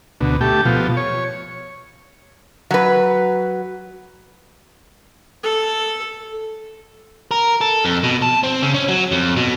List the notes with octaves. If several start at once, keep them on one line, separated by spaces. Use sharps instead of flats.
D2 B2
A3 G4
B2 F3
C#5
F#3 B4
A4
A#4
A4
F2
B2
A5
C4
C#3
C#4
F#3
F2
B2